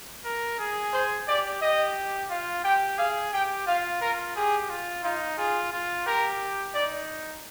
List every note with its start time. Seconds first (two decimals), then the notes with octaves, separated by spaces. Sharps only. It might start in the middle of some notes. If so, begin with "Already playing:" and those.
0.25 A#4
0.59 G#4
0.93 C5
1.28 G4 D5
1.62 G4 D#5
2.30 F4 F5
2.64 G4 G5
2.98 G#4 F5
3.33 G4 G5
3.66 F4 F5
4.01 F4 A#4
4.36 G4 G#4
4.69 F4
5.04 D#4 F4
5.38 F4 G#4
5.72 F4
6.06 G4 A#4
6.74 D#4 D5